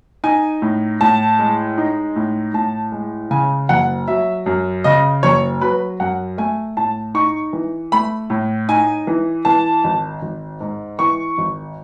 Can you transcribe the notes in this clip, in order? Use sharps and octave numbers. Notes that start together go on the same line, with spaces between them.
D#4 G#5
A2
A2 A5
G#3
D#4
A2
A2 A5
G#3
C#3 G#5
F#1 F#5
F#3 E5
F#2
C#3 D#5
F#1 C#5
F#3 B4
F#2 F#5
A3 G#5
A2 A5
D#4 C#6
E3
A3 B5
A2
D#4 G#5
E3
E3 A5
G#1
G#1
G#2
E3 C#6
G#1